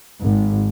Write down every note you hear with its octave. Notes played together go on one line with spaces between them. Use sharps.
G#1